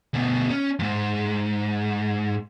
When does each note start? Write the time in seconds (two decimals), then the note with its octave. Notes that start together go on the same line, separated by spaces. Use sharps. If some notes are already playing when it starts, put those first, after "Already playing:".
0.14 D2 B2
0.51 C#4
0.79 F2 G#2